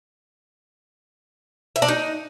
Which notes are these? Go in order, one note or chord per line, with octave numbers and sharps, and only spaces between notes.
E5
D4
D#4